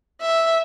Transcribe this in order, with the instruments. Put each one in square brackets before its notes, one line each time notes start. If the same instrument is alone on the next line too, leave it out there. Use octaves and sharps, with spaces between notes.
[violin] E5